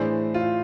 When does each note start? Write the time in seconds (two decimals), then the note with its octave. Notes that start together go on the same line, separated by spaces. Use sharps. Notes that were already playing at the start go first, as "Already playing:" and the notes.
Already playing: A2 E3 A3 D4 G#4 C5
0.34 F4